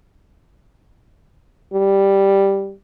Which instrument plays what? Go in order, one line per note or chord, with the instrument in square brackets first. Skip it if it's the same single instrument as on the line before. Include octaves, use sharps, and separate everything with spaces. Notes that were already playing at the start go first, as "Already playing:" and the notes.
[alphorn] G3